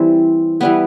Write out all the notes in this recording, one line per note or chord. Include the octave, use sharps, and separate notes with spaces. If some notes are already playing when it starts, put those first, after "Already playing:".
Already playing: E3 G3 C4
E3 G3 B3